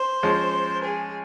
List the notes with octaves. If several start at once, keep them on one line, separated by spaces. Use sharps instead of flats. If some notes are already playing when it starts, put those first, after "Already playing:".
Already playing: C5
F3 G#3 C#4
G#4